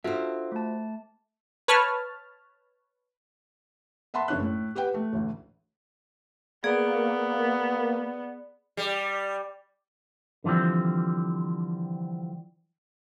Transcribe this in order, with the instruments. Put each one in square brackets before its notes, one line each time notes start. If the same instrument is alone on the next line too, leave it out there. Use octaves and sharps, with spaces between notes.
[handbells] D4 A4 [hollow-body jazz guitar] F4 E5 [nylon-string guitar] F#4 C5
[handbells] A3 A5
[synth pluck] B4 C#5 A5 F6
[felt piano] E5 F#5 A5 B5 C6 B6
F#1 C#4 D4 C#5 F#6
A2
G4 B4 F#5 G5
A3
A1 D2
[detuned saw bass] A#3 [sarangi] B3 [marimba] G#4 [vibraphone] D5
[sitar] G3
[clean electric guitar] D3 E3 F3 G3 C4